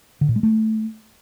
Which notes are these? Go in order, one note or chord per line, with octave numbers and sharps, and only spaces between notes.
D3
A#2
G#3
A3